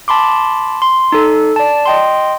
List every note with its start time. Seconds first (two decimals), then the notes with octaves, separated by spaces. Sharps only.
0.08 A5 B5 C6 D6
0.82 C6
1.12 D#4 A4
1.56 D5 A5
1.86 D#5 G5 C6